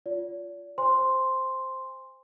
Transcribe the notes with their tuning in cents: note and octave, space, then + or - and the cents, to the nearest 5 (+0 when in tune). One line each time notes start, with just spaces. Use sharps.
F4 +0 D5 -40
C5 +0 G#5 -35 C6 +0